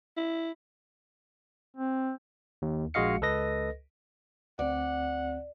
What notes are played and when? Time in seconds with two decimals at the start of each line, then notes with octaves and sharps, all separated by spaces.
0.17 E4
1.77 C4
2.62 D#2
2.94 A#1 G#3 F#4 D#5 F5 C#7
3.21 C#2 A4 B4 D#5 A#6
4.59 D2 C4 D5 F#5